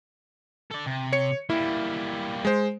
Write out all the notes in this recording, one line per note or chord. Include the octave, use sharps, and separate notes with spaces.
A4 D5
C3
C#5 C#7
G3 A#3 E4
G#3 C5